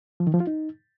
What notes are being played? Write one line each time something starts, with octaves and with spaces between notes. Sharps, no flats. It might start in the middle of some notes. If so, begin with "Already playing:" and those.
F3
D#3
F3
F4
D#4